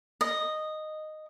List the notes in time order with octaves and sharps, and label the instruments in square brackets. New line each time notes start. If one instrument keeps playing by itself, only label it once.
[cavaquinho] D#5